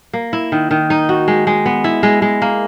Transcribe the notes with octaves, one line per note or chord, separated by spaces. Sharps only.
A#3
E4
D#3
D#3
D#4
F#4
G#3
G#3
B3
E4
G#3
G#3
A#3